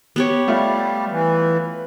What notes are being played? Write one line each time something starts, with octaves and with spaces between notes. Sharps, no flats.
B3 G4 C#5
G3 A3 F4 F5
E3